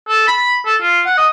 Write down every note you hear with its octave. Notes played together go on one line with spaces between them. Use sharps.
A4
B5
A4
F4
F#5
D#5